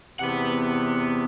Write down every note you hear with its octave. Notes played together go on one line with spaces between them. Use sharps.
E2 C3 B3 F#5